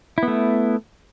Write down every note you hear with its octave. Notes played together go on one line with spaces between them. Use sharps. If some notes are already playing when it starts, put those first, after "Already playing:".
A3 B3 E4